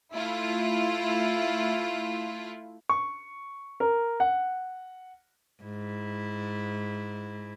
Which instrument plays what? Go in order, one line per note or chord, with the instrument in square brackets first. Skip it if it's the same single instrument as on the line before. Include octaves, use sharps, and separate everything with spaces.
[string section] A3 E4 F4
[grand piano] C#6
A#4
F#5
[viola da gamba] G#2 E4